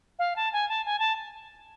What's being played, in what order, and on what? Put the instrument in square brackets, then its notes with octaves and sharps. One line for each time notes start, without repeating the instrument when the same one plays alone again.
[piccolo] F5
A5
G#5
A5
G#5
A5